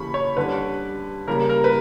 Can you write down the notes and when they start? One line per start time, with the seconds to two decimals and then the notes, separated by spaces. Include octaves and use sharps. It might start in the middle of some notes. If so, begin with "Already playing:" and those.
Already playing: C#3 E3 A#3 B5 C#6
0.14 C#5
0.37 D3 G3 C#4 B4
1.27 C#3 G3 A#3 A#4
1.49 A#4
1.64 B4